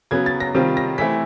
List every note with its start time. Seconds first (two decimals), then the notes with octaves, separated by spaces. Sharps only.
0.11 C#3 F#3 B3 G#6
0.26 A6
0.40 A#6
0.54 C3 D#3 G3 C4 F4
0.77 A#6
0.98 E3 A3 C4 E4 B6